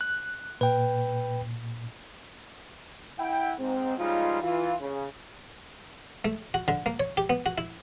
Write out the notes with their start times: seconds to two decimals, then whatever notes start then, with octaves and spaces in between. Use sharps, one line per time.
0.01 F#6
0.61 A#2 B4 G5
3.19 E4 F#5 G5
3.59 G#2 C4
3.98 C#3 F3 G3 G#3 D#4 F4
4.42 E3 F4
4.81 C#3
6.25 A3
6.54 F#4
6.68 D3
6.86 A#3
7.00 C#5
7.17 G4
7.30 B3
7.46 F#4
7.58 E4